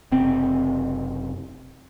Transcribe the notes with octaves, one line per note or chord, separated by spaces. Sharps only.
F#1 C3 C4